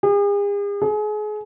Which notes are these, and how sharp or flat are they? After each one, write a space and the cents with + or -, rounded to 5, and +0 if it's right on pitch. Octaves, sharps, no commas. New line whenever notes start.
G#4 -45
G#4 +30